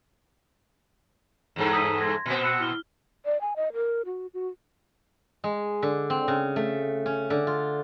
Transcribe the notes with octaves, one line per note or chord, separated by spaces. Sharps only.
E2 G2 A4
D#6 B6 D#7
C6 G#6 A#6
A#2 B3 C4
E6 F#6 C#7
E4 F6 G7
D5
G#5
D#5
A#4
F#4
F#4
G#3
D3
C4
C#3
A3
C#4
D3
F4